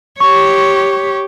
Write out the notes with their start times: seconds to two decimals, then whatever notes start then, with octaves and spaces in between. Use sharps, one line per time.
0.20 G4 C#5 C#6